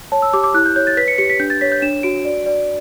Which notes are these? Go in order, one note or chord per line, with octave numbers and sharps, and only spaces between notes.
C#5 A5
E6
G4 D6
D6
E4 F#6
G6
C#5 G6
A6
B4 B6
C#7
G4 C#7
B6
D4 G6
A6
C#5 B6
G6
D4 E7
F#4 D7
D5
D5